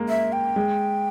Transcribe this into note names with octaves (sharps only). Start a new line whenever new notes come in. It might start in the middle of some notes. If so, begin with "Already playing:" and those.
Already playing: G#3 A#3
E5
G5
G#3